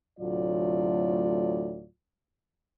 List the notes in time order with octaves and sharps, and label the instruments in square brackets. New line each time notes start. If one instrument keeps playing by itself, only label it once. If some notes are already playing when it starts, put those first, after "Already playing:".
[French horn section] D2 A2 C3 F#3 F4 D5